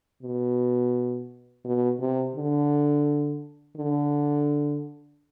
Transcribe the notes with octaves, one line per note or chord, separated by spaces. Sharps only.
B2
B2
C3
D3
D3